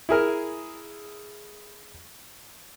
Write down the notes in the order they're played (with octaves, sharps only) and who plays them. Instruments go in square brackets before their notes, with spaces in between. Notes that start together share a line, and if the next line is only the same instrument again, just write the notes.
[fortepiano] E4 G#4 A#4